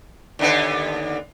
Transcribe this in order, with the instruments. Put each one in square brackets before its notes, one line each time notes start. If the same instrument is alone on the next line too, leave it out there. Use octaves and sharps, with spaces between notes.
[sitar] D#2 D3 B3